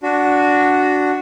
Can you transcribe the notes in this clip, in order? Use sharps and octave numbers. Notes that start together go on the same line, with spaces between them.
D4 F#4